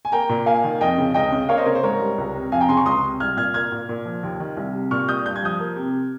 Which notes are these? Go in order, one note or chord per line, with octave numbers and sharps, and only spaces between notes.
G#5
A#3 G5 A#5
A#2
A#3 F5 G#5
D#3
F2 D#5 G5
C#3
C#2 D#5 G5
C#3
A#3 C#5 F5
C5 D#5
C#3 A#4 C#5
C5
G#2 A#4 C#5
G3
C#2
C3
F2 F5 G#5
G5 A#5
C#3 G#5 C6
A#5 C#6
C#2 C6 D#6
C3
C2 F6 G#6
A#2 F6 G#6
A#3 F6 G#6
A#2
A#2
F3
D#2
D#3
C2
C3
A#2 C#6 F6
G3 D#6 G6
G2 G6
G#6
F3 D#6 G6
A#3
C3